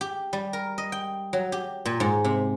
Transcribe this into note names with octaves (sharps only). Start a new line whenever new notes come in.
G4
G3
A#4
D#5
G5
F#3
G4
A#2
G#2
C3